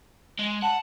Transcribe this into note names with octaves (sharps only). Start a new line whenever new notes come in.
G#3
F#5 A5